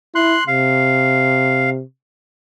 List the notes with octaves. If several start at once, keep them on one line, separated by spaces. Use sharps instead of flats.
E4 C6 F#6
C3 F5